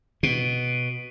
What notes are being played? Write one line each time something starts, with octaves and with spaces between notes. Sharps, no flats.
B2